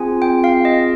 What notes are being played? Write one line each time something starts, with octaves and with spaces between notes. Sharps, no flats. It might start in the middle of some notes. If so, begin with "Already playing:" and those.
Already playing: C4 F4 G#4 G#5
G5
F5
D#5